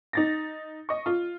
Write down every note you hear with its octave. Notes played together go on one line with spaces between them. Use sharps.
D#4 A6 A#6
D#5 C#6
F4